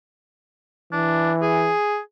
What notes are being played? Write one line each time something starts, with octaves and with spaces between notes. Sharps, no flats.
E3 D4
G#4